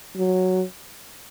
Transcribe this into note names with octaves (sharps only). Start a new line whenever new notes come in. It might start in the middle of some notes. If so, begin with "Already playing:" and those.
F#3